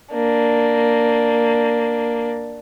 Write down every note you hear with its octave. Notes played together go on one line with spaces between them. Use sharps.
A#3 D4